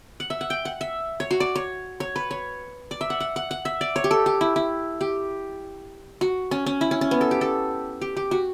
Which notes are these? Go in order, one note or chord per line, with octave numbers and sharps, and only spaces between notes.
F#5
E5
F#5
G5
F#5
E5
C#5
F#4
D5
C#5
C#5
B4
C#5
D5
E5
F#5
F#5
F#5
F#5
E5
D5
C#5
G4
A4
G4
E4
E4
G4
F#4
C#4
C#4
E4
C#4
C#4
B3
A4
G4
A4
G4
G4
F#4